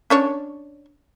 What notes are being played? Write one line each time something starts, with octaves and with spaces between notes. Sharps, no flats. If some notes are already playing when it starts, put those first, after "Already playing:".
C#4 D4 C#5